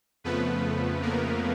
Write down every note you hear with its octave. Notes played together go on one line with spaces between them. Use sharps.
F2 C#3 F3 A3 B3 B4
A#3 A#4